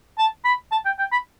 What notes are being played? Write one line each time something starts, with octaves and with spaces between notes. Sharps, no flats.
A5
B5
A5
G5
G5
B5